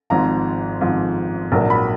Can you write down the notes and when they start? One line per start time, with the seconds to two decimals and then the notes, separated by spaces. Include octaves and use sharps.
0.10 G#1 G#2 F3 A#5
0.81 G#1 G#2 F3
1.52 A#1 G#2 F#3 A#3 A#5
1.70 B5